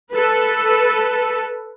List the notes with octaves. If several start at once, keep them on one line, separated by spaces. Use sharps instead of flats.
A4 B4